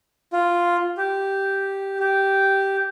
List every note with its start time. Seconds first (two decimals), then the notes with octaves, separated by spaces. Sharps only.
0.33 F4
0.98 G4
2.00 G4